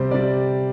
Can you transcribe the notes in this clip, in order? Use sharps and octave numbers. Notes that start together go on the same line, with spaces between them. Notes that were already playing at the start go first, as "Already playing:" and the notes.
Already playing: C3 G3 C5
C3 G3 D5